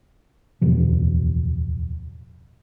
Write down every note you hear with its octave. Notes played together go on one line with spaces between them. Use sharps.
D1 E2 B2 F3